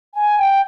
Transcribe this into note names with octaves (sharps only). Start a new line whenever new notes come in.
G#5
G5